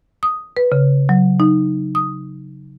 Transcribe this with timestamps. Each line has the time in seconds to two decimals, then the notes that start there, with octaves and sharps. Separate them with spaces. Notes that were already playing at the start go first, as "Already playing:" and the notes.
0.23 D#6
0.57 B4
0.72 C#3
1.09 F#3
1.40 D#4
1.95 D#6